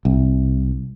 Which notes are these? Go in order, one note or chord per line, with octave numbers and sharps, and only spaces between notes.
C2